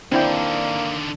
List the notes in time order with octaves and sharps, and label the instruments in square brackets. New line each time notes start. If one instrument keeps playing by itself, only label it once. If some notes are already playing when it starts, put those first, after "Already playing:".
[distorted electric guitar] D3 D#3 [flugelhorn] A#3 [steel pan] C4 E4 G5 [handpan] D4